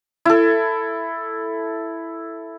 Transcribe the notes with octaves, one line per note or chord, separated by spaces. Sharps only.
E4 A4